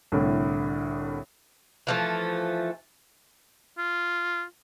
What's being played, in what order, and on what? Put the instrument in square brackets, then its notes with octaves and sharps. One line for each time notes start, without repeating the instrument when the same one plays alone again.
[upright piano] C2 A2 D3
[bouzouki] E3 F3 A3
[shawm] F4